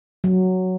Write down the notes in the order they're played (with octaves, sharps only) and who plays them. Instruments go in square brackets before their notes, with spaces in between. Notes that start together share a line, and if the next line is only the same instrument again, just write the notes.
[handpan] F#3